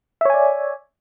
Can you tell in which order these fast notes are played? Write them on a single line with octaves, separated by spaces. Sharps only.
E5 C#5 G#5 D5